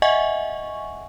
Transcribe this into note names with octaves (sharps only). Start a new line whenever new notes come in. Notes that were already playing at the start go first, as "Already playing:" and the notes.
D#5 E5 F#5 G#5 C#6